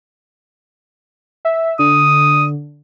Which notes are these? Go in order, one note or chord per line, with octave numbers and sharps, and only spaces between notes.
E5
D3 D#6